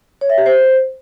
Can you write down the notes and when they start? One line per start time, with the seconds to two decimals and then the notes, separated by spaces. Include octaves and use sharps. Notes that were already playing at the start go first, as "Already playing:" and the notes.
0.21 C#5
0.30 E5
0.38 G4
0.46 C5